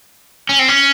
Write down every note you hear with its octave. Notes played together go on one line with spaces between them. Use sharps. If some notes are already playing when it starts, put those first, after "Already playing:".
C#4
C4
C#4